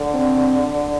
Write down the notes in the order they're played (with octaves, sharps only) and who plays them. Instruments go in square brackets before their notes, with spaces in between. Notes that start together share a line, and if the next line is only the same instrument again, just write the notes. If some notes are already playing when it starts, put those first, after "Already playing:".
Already playing: [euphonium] D3
[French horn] C4